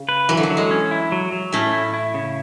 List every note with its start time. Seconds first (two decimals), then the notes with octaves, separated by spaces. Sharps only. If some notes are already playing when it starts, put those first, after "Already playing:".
Already playing: C#3
0.09 B4
0.29 E3 F#3
0.37 D3
0.43 E3
0.50 F#3
0.57 G#3
0.71 C#4
0.91 E4
1.12 F#3
1.32 F#3
1.53 A2 A3 C#4
1.73 E4
1.94 E4
2.14 C#3